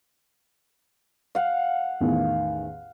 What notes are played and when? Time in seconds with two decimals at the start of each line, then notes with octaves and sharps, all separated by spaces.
1.35 F5 F#5
2.01 A1 E2 D#3